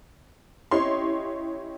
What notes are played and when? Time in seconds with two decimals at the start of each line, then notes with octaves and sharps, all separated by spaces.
0.71 C#4 E4 G4 C#5 D#5 C6